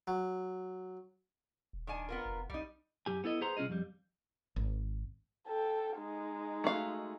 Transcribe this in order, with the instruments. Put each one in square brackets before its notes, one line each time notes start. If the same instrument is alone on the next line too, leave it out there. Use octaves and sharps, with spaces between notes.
[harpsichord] F#3
[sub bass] D#1
[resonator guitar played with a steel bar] D#3 D4 G#5
B3 F4 A#4
[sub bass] F1
[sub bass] B1 [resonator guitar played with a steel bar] G3 D#4
[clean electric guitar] F#2 F#3 G4 G#5
B3 E4 A4 D#5
G#4 B4 C5 F#5 A#5 C6
C2 C#4 F4 G#4 D#5
F2 G3
[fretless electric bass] G#1
[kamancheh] A4 G5
G#3 D#4
[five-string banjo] A3 F#4 F5